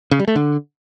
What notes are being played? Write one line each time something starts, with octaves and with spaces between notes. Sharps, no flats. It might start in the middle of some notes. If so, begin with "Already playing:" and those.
C#3
G3
A3
D3